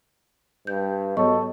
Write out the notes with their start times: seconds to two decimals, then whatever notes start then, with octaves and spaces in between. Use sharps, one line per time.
0.67 G2 G6
1.17 G#2 F#3 B3 A4 C#5 D#5 C#6